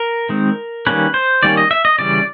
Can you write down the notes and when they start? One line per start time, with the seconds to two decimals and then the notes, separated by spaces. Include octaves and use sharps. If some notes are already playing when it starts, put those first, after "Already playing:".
Already playing: A#4
0.29 D#3 G#3 C4
0.87 D#3 G3 A#3 C#4 B4
1.14 C5
1.43 D#3 G3 A#3 C#4 D5
1.57 D#5
1.71 E5
1.85 D#5
1.99 C#3 E3 G3 D5